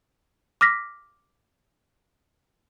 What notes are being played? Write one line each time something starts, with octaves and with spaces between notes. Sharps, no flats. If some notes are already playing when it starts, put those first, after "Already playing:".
D6 F6 A#6 B6